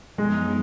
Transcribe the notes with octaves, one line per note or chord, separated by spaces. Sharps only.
F#2 F3 G#3 B3 D#4